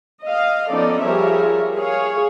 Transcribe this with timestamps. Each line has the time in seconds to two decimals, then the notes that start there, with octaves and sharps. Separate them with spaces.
0.22 D#5 F5
0.70 F3 B3 C#4 D#4 A4 D5
1.02 F3 G3 G#4 A#4 C#5 E5
1.76 G#4 C#5 F5